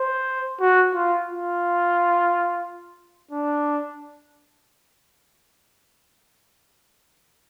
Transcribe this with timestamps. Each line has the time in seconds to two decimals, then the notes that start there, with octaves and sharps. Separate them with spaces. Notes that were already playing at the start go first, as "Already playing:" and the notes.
Already playing: C5
0.61 F#4
0.94 F4
1.28 F4
3.31 D4